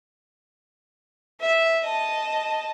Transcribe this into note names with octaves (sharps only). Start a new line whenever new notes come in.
E5
D#5 A5